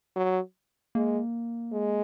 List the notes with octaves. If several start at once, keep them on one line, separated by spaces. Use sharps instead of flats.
F#3
G#3 A#3
G#3